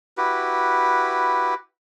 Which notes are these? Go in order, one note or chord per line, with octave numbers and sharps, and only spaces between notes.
E4 F#4 G4 B4